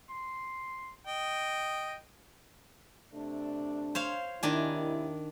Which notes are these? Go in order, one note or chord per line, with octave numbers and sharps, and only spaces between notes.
C6
D#5 G5
C3 A3 D4
C5 C#5 F5
D#2 C3 D#3 D4 E4 G#5